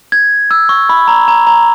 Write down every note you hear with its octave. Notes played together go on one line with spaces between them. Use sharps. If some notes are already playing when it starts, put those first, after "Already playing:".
G#6
E6
C#6
B5
A#5
A#5
A#5